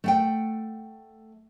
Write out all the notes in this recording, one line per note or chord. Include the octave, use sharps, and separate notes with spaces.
A3 F#5 G5